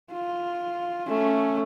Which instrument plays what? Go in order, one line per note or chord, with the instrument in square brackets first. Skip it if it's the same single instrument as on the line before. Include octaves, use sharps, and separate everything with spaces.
[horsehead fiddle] F4
A3 C#4